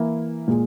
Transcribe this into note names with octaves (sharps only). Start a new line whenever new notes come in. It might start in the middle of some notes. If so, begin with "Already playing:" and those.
Already playing: E3 A#3 E4
A#2 G#3